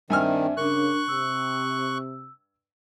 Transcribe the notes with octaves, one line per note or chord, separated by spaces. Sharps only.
G2 D#3 C4 D4 E5 G#5 F6
C#3 D4 A#4 C#6 F#6
C3 E6